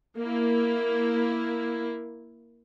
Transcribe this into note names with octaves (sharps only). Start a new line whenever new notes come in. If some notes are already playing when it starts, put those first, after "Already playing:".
A#3 E4